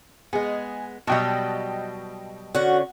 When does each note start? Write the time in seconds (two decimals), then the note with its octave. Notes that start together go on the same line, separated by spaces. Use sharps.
0.33 G#3 B3 G#4
1.07 B2 F#3 G3 D#5 G5 A5
2.55 D3 C#4 F#4 F#5